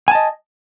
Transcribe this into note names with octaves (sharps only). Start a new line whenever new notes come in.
D#5 G#5 A5